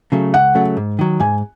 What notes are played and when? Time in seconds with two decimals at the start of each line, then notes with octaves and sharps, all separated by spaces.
0.12 C#3 F#3 A3
0.33 C#2 F#5
0.55 C#3 F#3 A3
0.77 G#2
0.99 D#3 F#3
1.20 G#2 G#5